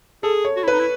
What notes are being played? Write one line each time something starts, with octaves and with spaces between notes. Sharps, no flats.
G#4 A4
C#5
F#4
E4
B4
D#4
E4